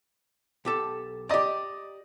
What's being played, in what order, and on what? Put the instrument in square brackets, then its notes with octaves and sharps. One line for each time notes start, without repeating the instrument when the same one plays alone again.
[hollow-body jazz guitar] B1 G4 A4
[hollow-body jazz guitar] G4 A#5 [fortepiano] D5 D#5